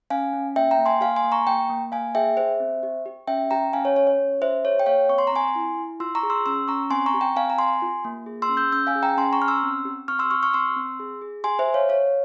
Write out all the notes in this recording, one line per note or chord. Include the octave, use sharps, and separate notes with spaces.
C#4 F5 G#5
C#4
A#3 E5 G5
G5 A#5
A#3
G#5 C6
G4 F5 G#5
G#5 C6
A#3
A#5 C#6
A#3 G5 A#5
A#3
A#3 F5 G#5
G#4 E5 G5
G4 C5 E5
C4
G4
G4
C#4 E5 G5
G4 G5 A#5
C#4 F5 G#5
C#5
G4 C#5
C#5
C#4
F4 C5 E5
G#4 C#5
G5
A#3 C#5 F5
C4 C#6
C6
A#5
C4 G#5 C6
E4
E4
F4 C6 E6
A#5 C#6
G#4
C6 E6
C#4 C6 E6
C#4 A#5 C#6
C4 G#5 C6
A#5 C#6
G4
G5 A#5
C4 F5 G#5
A#5
G4 G#5 C6
F4
A#3
G#4
C6 E6
C#4
E6 G6
C#4 E6 G6
F5 G#5
G#4
G5 A#5
C#4 G#5 C6
A#5 C#6
C#4 F6
C6 E6
C4
G4
C4 C#6 F6
C6 E6
G4 C#6 F6
C#6 F6
C4 C6 E6
C4
G#4
G#4
G4 G#5 C6
C5 E5
G4
C#5 F5
G4 C#5 F5